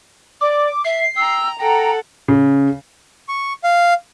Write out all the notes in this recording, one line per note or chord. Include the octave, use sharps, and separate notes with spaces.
D5 D6
E5 C7
G5 A#5 E6
A4 F#5 G5 A#5
C#3
C#6
F5